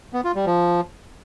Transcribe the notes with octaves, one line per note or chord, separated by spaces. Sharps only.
B3
F4
G3
F3